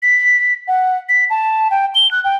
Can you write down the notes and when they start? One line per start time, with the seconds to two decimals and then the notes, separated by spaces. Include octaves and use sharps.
0.03 B6
0.68 F#5
1.09 B6
1.30 A5
1.71 G5
1.95 G7
2.11 F#6
2.24 G5